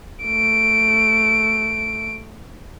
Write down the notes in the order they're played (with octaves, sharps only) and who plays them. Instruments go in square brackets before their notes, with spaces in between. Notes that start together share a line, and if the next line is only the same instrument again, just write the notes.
[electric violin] A3 D7